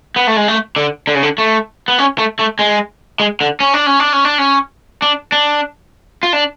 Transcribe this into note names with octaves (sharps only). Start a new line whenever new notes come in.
B3
A3
G#3
A3
D3
D3
C#3
D3
A3
B3
C#4
A3
A3
G#3
G#3
D3
C#4
D4
C#4
D4
C#4
D4
C#4
D4
D4
F4
D4